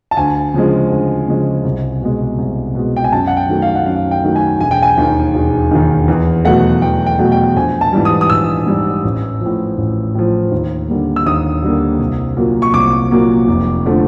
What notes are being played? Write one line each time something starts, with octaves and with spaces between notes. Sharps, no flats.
A5
D2 G#5
C#3 F3 G#3
D2
C#3 F3 G#3
C2
B2 G#3
C2
B2 G#3
G5
G#5
F#2 A5
F#5
G5
D#3 F#3 A3
F5
F#5
F#2 F5
G5
D#3 F#3 A3
G#5
E1 G#5
G5
G#5
D#2 D#3
E1
D#2 D#3
E2
B2 F#3 A3 F#5
E2 G5
G5
B2 F#3 A3
G5
A#1 G#5
A5
G#2 E3 G3
D#6
D#6
A#1 E6
G#2 E3 G3
A1
A2 F3
A1
A2 F3
D#2
D3 G3 A#3
E6
D#2 D#6
D3 G3 A#3
C2
A#2 F#3 A#3
C#6
C2 D6
A#2 F#3 A#3
F1
D3 F3 A3